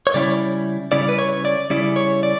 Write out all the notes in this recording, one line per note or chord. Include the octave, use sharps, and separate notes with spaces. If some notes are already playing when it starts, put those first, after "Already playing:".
C#5
C#3 G3 C#4 E4 D5
C#3 G3 C#4 E4 D5
B4
C#5
D5
C#3 G3 C#4 E4 D5
C#5
D5